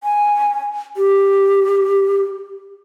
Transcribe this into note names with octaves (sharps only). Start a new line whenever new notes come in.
G#5
G4